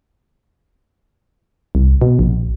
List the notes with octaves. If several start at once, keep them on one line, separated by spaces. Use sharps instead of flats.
C2
B2
A#1